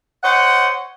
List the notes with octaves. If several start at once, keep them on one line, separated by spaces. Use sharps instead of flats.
C5 C#5 D#5 F#5